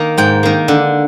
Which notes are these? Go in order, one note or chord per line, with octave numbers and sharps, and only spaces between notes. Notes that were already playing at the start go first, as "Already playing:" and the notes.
Already playing: D#3 A#3
G#2 G5
D#3 A#3
D3